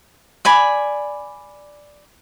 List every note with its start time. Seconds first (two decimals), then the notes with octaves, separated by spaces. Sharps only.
0.45 D5 G#5 B5